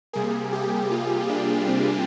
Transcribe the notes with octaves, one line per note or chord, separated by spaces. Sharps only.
C3 G3 A#3 G#4
G4
F4
D4
C4